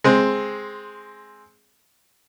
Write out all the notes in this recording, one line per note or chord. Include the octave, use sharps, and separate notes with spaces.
G#3 C4